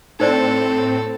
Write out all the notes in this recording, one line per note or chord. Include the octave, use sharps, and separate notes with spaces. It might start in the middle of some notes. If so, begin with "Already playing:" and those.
A2 C4 D#4 A4 C5 D5